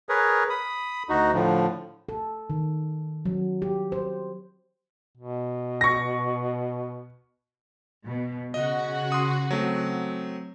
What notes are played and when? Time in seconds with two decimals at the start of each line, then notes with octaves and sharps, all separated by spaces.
0.09 G#4 A#4 B4 C#5
0.50 B5 D#6
1.09 D2 D#4 F#4
1.34 A2 D3 F3
2.09 A4
2.50 D#3
3.25 F#3
3.62 G4
3.92 C5
5.18 B2
5.81 C#6 A#6
8.07 B2
8.54 C#3 F#4 D#5
9.12 C6 D#6
9.51 F#3 A3 C4